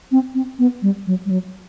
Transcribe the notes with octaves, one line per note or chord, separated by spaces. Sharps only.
C4
C4
B3
G3
F#3
G3
F#3